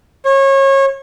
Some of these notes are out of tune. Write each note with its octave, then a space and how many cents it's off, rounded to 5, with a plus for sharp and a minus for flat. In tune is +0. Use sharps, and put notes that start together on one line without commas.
C#5 -30